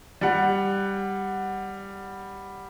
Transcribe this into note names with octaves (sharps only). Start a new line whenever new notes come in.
G3 F#5